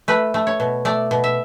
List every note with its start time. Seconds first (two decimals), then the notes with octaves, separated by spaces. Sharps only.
0.08 A3 B4
0.34 A3
0.47 C#5
0.60 B2
0.85 A3 D5
1.11 B2
1.24 E5